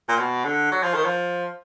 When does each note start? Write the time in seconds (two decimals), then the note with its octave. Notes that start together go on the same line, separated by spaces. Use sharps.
0.09 A#2
0.19 B2
0.45 D3
0.72 F#3
0.83 F3
0.94 D#3
1.05 F3